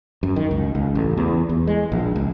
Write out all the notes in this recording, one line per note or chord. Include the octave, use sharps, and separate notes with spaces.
F#2
D#3
C#2
C#2
A1
E2
E2
G#3
A#1
C#2